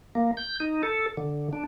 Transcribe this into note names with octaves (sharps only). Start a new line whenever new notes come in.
A#3
G6
D#4
A4
D3
D4